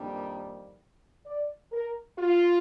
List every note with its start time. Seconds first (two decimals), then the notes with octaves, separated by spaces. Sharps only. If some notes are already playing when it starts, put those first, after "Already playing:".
Already playing: F2 D#3 G3 A#3 D4
1.26 D5
1.72 A#4
2.18 F4